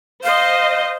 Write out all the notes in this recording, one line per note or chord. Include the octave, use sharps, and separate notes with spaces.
C5 D#5 F5